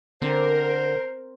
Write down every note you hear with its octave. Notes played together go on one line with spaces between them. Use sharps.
D3 C4 A#4 C5